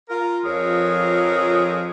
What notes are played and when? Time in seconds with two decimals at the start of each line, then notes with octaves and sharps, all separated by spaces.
0.09 F4 A#4
0.45 F2 F3 G#4 A#4 C#5